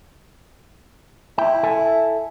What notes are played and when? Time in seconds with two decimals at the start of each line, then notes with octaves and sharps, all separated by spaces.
1.38 E4 G5
1.63 A4 E5 G#5